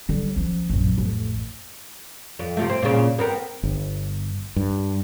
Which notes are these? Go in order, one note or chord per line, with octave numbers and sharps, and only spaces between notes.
D3 G3
F3 C#4
A#1 F#2
A1 F2
F2
C3 F3 A3
C4
A#2 C#3
B3 C4 A#4
G1
G2